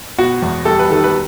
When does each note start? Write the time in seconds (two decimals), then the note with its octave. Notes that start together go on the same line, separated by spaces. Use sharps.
0.19 B2 F#4
0.42 E2
0.65 G3 A4
0.79 B4
0.90 D#3 A4
1.04 B4